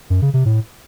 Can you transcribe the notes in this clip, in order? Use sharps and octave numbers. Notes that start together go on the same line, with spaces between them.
F#2
C#3
C3
A2